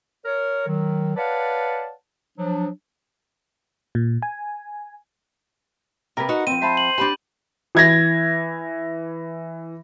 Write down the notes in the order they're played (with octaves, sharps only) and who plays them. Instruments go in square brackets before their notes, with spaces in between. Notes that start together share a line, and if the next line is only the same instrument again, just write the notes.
[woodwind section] A#4 C#5
D#3 F#3
B4 C#5 D5 F5 F#5 A5
F3 F#3 D4
[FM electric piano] A#2
G#5
[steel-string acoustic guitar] C3 A#3 [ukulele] A#4 B4
[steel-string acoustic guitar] D#4 F#4 F#5
[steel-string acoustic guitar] F3 C4 [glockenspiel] D#7
[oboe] C5 [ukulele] E5 A5 B5
[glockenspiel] F#7
[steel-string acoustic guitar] D4 A5 [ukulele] G4 B5
[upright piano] E3 G#6 A#6